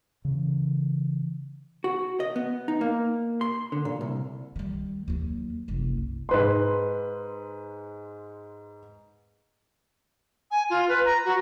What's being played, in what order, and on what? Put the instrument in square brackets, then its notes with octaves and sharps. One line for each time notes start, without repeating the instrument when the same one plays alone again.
[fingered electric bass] C#3 E3
[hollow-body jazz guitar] F#4
D#5
B3
D#4
A#3
C6
D3
A#2
C2
[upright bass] D#3 G3
D#2 F#3
F#1 C2
[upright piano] G#2 B4 C6
[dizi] G#5
F4
B4
A#5
F#4